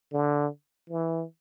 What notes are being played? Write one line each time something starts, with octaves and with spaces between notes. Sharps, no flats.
D3
E3